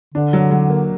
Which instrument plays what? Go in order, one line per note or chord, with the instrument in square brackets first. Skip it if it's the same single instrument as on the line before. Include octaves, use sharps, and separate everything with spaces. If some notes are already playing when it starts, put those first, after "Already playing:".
[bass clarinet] D3 [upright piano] D4
[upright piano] F#3
F#3
A#3